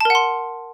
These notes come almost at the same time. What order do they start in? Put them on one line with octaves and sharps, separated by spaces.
A5 A#4 F#5 C6